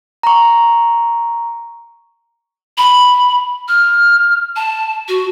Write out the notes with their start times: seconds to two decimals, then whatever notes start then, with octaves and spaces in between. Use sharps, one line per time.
0.23 A#5 C#6
2.78 B5
3.68 F6
4.56 A5
5.08 F#4